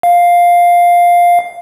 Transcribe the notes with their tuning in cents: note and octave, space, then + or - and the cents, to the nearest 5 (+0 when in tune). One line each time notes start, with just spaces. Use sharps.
F5 +5